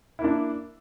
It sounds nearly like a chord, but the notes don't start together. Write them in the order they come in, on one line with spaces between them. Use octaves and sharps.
E4 A#3 D4